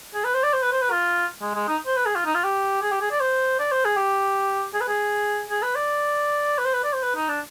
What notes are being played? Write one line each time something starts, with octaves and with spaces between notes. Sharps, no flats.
G#4
B4
C5
D5
C5
B4
C5
B4
F4
G#3
G#3
D#4
C5
B4
G#4
F4
D#4
F4
G4
G#4
G4
G#4
D5
C5
D5
C5
G#4
G4
G#4
B4
G#4
G#4
B4
D5
B4
C5
B4
D5
C5
B4
D#4
D4